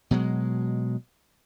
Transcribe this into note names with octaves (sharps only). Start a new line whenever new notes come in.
B2 F#3 G#3